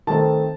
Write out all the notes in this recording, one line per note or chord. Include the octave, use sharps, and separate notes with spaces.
D#3 A3 C4 A5